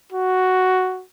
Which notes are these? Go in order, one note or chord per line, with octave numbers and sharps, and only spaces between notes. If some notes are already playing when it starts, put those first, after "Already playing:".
F#4